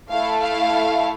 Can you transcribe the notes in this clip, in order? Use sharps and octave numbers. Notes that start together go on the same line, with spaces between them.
A3 E4 A4 F5
F5